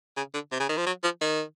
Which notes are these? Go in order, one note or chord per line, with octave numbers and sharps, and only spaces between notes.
C#3
D3
C3
C#3
D#3
F3
F#3
F3
D#3